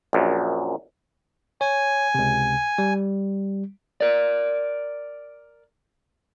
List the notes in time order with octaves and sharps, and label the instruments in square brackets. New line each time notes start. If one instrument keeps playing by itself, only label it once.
[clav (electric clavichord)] A#1 F#2
[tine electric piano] C#5 [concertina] G#5
[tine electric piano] C#2 C3
G3
[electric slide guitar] A#4 D5